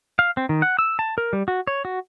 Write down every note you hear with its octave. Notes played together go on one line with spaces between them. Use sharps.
F5
C4
D#3
F#5
E6
A5
A#4
G3
F#4
C#5
F#4